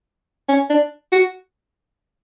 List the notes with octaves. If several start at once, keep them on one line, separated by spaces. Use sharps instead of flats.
C#4
D4
F#4